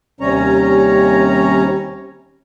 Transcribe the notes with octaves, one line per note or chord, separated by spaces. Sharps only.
D#2 C3 G3 C#4 C#5 A#5